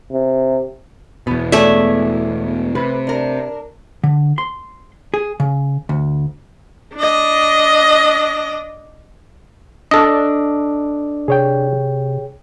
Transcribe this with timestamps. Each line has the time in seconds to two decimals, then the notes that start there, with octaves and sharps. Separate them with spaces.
0.12 C3
1.27 E2 B2 B3
1.52 A3 G#4 C#5 D5 E5
2.75 C3 B4
3.07 D4 A#4
4.04 D3
4.38 C6
5.14 G#4
5.40 C#3
5.89 D2
6.95 D4 D#5
9.91 D4 A4 D#5
11.28 C3 G#4 C#5 G5